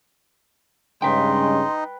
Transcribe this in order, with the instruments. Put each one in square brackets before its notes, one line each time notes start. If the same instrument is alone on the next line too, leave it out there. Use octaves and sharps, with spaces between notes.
[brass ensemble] G2 C#3 G#3 [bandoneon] D#4 [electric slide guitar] B4 G5 [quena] C6